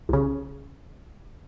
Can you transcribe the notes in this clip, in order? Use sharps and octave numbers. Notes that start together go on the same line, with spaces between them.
C2 C#3